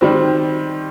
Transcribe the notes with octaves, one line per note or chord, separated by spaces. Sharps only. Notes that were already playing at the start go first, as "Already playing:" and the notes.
D#3 G3 C4